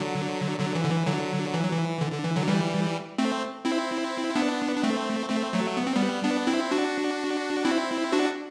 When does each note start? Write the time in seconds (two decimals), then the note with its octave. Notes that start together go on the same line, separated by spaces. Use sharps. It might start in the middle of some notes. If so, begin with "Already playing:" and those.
Already playing: D3 F#3
0.60 D3 F#3
0.75 E3
0.84 D3
0.90 E3
1.06 D3 F#3
1.54 E3
1.63 F#3
1.72 E3
2.01 D3
2.12 D3
2.24 E3
2.36 D3 F#3
2.48 E3 G3
3.18 A3 C4
3.65 C4 E4
4.36 B3 D4
4.76 D4
4.83 A3 C4
5.29 A3 C4
5.53 F#3 A3
5.77 B3
5.87 C4
5.96 G3 B3
6.24 B3 D4
6.47 C4 E4
6.71 D4 F#4
7.65 C4 E4
8.12 D4 F#4